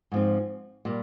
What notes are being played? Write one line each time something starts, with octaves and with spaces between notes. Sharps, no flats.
G#2 F3 C4
A#2 G3